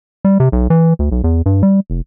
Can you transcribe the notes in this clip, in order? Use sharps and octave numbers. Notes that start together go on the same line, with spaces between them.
G3
C3
B1
E3
D2
B1
E2
G2
G3
F1